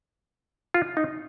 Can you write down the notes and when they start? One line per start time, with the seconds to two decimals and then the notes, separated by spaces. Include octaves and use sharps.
0.74 F4
0.97 D#4